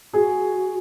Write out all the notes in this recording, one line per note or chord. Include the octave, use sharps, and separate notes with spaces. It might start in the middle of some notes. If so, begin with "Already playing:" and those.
F#4 G#4